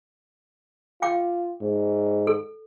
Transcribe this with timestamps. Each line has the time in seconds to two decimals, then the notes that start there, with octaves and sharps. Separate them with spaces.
1.02 F4 F5 G5 D6
1.61 G#2
2.27 A4